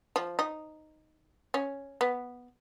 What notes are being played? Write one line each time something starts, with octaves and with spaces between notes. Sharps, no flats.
F3
D#4
C#4
B3